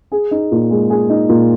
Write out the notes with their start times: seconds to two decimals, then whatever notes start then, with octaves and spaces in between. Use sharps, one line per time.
0.12 G#4
0.31 D#4
0.52 A#2
0.71 G#3
0.90 G#4
1.09 D#4
1.29 A#2